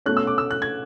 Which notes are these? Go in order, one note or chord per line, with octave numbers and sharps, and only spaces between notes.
B2 A3 C#4 F#6
E6
D6
E6
F#6
G#6